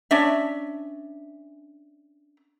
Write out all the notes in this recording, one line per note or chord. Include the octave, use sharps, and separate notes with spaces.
C#4 D4 E5